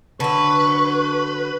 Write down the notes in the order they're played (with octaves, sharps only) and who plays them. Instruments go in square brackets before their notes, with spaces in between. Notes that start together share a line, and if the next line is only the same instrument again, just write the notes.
[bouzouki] D3 F#3 [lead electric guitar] B4 [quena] C#6